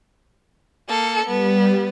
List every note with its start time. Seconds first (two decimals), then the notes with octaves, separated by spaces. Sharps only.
0.89 A#3 A4 C#7
1.26 G3 B3